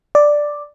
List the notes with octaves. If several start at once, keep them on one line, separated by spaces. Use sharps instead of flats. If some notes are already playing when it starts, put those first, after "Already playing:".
D5